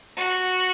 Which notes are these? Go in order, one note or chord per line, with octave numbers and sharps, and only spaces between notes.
F#4